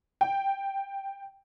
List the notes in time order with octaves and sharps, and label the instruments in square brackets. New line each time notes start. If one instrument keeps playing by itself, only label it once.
[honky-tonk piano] G5